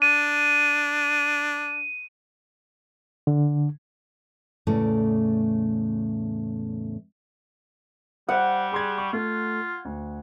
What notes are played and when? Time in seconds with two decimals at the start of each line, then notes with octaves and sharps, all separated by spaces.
0.02 D4 D#7
3.27 D3
4.67 E2 A2 C#3 A3 D5
8.29 G3 C5 F#5
8.72 G#4 C6 G#6
8.98 C#6
9.13 A3 F4
9.85 D2